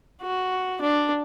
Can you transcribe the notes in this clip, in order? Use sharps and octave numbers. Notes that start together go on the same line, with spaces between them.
F#4
D4